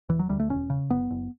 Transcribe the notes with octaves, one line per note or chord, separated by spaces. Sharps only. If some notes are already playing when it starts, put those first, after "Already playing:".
E1 E3
F#3
D2 G3
A3
E1 C#4
C#3
F#1 B3
F#1